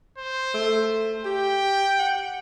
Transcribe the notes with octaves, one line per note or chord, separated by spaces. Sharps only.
C5
A3
G4 G5
F#5